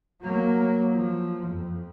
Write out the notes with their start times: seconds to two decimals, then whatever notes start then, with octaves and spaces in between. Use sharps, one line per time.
0.21 F#3 A#3
0.92 F3
1.46 F2